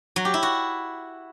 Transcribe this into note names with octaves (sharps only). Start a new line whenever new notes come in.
F#3
G4
E4
F#4